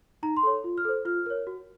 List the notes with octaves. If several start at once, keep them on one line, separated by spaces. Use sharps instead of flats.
D#4 A#5
C6
A4 C#5
F4
F6
A4 C5
F4 F6
A#4 C#5
F#4